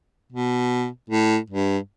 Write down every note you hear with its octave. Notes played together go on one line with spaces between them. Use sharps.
B2
A2
G2